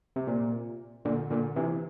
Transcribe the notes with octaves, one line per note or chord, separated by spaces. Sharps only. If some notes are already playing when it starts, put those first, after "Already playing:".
C3
A#2
A#2 D3
A#2 D3
C3 E3